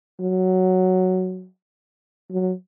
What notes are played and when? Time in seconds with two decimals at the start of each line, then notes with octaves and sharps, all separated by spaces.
0.20 F#3
2.31 F#3